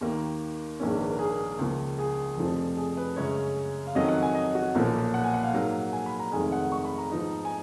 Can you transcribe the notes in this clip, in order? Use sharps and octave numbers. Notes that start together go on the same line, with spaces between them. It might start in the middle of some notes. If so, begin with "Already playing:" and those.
D#2 D#3 A#3
A#1 G#2 D#3 A#3 C#4
B4
A#4
G#4
A#4
C#2 C#3 F3 A#3
G#4
F1 F2 F3
G#4
B4
F#2 C#3 G#3 C#4 C#5
F5
F2 D#3 F#3 C#4 D#5
F#5
G#5
D#5
F#4
B1 A#2 F3 A#3 C#4
F#5
G#5
F#5
F5
G#2 F#3 A#3
G#5
B5
A#5
F1 F2 D#3 G#3 G#5
F#5
C#6
B5
A#5
G#2 F3 B3 D#4
G#5